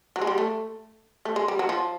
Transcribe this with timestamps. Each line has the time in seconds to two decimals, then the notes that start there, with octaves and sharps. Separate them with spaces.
0.16 F#3
0.22 G#3
0.27 G3
0.38 A3
1.25 A3
1.36 G#3
1.48 G3
1.59 F#3
1.69 F3